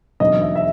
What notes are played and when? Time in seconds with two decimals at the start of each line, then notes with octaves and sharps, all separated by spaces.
0.20 E1 D#2 D3 F#3 D#5
0.42 E5
0.55 E5